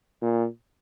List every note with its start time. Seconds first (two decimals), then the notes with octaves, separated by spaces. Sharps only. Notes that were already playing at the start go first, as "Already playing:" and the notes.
0.22 A#2